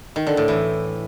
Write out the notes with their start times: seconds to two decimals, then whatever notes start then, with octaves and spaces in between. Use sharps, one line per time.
0.16 D#3
0.27 D3
0.37 A2
0.48 E3